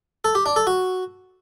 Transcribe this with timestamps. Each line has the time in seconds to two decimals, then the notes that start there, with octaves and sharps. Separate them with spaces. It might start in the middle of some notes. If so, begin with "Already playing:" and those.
0.24 A4
0.35 G4
0.46 D4
0.56 A4
0.67 F#4